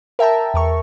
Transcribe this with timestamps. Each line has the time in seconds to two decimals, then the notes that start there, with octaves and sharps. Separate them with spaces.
0.19 A#4 E5 G5 A5 A#5
0.54 E2 A#4 C#6